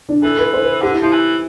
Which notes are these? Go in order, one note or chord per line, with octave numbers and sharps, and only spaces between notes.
D4
E3 A4
B4
C5
B4
D3 G4
E4
F3 E4
E3